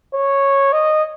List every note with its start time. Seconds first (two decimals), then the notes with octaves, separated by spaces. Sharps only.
0.14 C#5
0.73 D#5